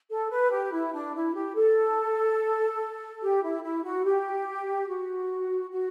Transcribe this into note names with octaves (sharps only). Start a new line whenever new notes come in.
A4
B4
G4
E4
D4
E4
G4
A4
G4
E4
E4
F#4
G4
F#4
F#4